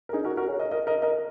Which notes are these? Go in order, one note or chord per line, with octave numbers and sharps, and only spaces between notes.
A#4
D#4 G#4
F#4 A#4
F#4 A#4
G#4 C#5
A#4 D#5
A#4 D#5
A#4 D#5
A#4 D#5